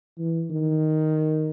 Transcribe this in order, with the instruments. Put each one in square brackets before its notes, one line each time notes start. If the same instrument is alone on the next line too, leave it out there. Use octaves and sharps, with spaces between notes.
[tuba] E3
D#3